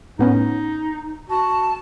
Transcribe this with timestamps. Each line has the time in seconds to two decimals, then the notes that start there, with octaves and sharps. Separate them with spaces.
0.19 A2 B3 C#4 D#4
1.30 F#4 A5